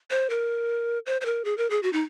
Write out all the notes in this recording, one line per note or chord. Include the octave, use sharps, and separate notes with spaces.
C5
A#4
C5
C5
A#4
G#4
A#4
G#4
F#4
D#4